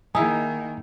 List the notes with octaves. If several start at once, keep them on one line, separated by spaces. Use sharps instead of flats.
D#3 A#3 D#4 E4 G#4 G#5